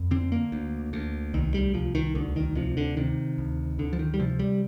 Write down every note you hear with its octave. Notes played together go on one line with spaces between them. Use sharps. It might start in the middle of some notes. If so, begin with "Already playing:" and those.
Already playing: F2
D3 C4
A#3
D2
D2
C2 D#3
G3
C2 F3
D#3
D2 D3
D#3
C3 F3
D3
C3 D#3
D2
D2 D3
F3
D#3
G3
C3 F3
G3